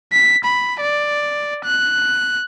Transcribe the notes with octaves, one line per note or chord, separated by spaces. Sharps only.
B6
B5
D5
F#6